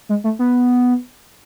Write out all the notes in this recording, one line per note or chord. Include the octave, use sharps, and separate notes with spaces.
G#3
A3
B3